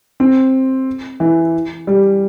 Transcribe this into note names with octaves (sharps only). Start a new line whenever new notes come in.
C4
E3
G3